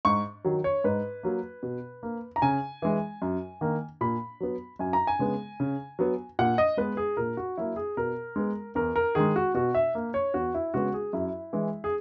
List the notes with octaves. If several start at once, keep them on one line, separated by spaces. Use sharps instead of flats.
G#2 C#6
D#3 F#3
C#5
G#2 B4
F#3 A#3
B2
A#3
A#5
C#3 G#5
E3 G#3
F#2
D#3 A#3
A#2 B5
F#3 B3
F#2 G#5
A#5
G#5
C#3 G#3 B3
C#3
F#3 B3
A#2 F#5
D#5
G#3 B3 B4
G#4
A#2 A#4
F#4
F#3 A#3 E4
G#4
B2 A#4
G#3 B3
E2 A#4
A#4
D#3 G#3 G#4
F#4
B2 F#4
E5
A#3
C#5
E2 F#4
E4
C#3 G#3 B3 F#4
G#4
F#2 E4
E3 G#3
G#4